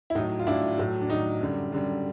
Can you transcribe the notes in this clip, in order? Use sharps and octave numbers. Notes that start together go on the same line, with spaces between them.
E4
A2 F#3 D#4
F4
A2 F#3 D4 E4
A2 F#3
D4
A2 F#3 D#4
F#2 D3 G3
F#2 D3 G3